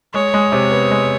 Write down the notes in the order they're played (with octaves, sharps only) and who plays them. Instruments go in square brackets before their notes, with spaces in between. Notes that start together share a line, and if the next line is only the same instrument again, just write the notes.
[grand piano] G#3 [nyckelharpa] C#5
[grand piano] G#3
C3
B3
G#3